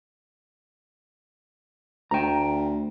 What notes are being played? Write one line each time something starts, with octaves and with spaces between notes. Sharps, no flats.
D2 G5 A#5